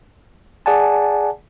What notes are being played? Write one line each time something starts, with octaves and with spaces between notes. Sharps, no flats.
G#4 D5 F#5 G#5 A5